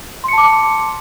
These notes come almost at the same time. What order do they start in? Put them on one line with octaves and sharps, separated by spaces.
C6 C#7 A5 D6